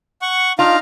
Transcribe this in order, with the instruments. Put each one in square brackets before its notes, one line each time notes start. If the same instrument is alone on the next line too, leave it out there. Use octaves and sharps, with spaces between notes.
[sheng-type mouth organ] F#5 C#6
[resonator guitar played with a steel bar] D4 F4 [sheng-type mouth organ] D#4 F5 A#5